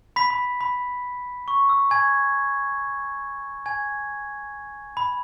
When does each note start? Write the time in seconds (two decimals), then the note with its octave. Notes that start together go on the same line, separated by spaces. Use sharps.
0.16 B5 B6
0.30 B5
0.61 B5
1.48 C#6
1.69 E6
1.91 G#5 G#6
3.66 G#5 G#6
4.97 B5